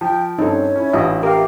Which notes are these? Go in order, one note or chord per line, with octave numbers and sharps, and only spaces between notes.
F3 G5
G2 C4 C#4 D#4 A4 C#5
C#4 E4
A1 D4 F4 D#5 E5
G4 A#4 E5 F5